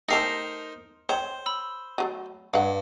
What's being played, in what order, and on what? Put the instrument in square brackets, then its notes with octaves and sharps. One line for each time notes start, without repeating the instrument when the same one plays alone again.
[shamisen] A3 G4 A4 [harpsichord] D#4 A#4 C5 [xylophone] A#6 C7
[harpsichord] C5 [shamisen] C#5 G5
[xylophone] B5 E6
[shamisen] F#3 G#3 A3
[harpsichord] G2 [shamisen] F5 F#5